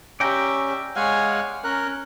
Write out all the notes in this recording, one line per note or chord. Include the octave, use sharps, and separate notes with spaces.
C#4 G4 D5 E5 G5 A#5
G#3 C#5 F5 F#5 G#5
C#4 A#4 F#6